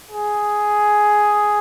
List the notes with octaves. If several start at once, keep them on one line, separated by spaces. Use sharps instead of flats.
G#4